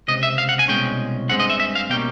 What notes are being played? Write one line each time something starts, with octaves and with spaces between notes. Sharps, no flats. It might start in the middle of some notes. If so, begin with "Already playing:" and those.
C#2 C3 D#5
E5
F5
F#5
G#5
C2 B2 G#3 C#4 G5
G2 D#3 G#3 C4 F#5
D#5
E5
E5
F5
B2 G3 A#3 C#4 G5